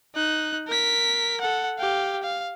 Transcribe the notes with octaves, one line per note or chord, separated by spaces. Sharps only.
D#4 F#6
A#4 B6
A4 F#5
G4 F5
F5